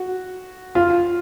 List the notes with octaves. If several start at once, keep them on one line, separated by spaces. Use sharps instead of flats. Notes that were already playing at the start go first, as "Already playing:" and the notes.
Already playing: F#4
F4